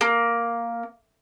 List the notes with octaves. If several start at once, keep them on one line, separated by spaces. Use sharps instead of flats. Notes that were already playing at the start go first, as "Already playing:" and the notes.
A#3